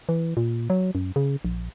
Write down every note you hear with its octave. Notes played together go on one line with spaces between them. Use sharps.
E3
A#2
F#3
F#2
C#3
A#1